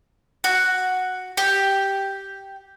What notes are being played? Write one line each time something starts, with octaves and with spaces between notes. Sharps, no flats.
F#4
G4